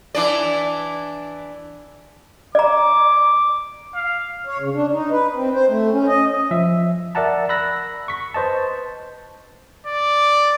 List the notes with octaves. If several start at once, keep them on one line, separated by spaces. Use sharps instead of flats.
E3 D4 D5
D5 A#5 D6
F5
C#5
C#3
D4
D#4
B4
C4
C5
A3
C#4
D#5
F3 E5
A#4 D5 E5 F#5 A5 A#5
B5 E6 F#6 A#6
C#6 B6
B4 C5 D#5 A5
D5